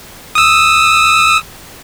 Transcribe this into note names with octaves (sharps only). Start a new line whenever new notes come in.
D#6 E6